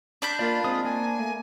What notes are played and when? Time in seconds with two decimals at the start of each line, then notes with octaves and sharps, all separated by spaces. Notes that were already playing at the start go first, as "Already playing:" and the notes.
0.22 D4 B5 G6
0.39 A#3 F4 D5
0.64 G#3 C4 D#6
0.84 A#3 G#5
1.17 A3